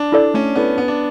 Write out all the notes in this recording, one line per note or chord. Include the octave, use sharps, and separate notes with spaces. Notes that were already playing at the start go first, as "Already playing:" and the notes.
Already playing: D4
E4 A4 D5
A3 C#4
B3 E4 A4 D5
B3 D4
D4